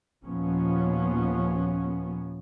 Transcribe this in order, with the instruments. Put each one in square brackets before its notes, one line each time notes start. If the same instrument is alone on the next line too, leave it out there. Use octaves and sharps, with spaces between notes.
[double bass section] D#2 A#2 F3 B3 C#4